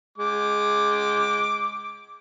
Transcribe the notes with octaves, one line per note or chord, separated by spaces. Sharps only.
G#3 D6